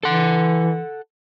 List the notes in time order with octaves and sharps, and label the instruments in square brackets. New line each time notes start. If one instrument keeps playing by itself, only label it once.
[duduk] E3 [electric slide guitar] A4 F#5